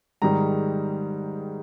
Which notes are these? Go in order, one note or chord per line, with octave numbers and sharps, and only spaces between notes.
G#2 D#3 G3 A#5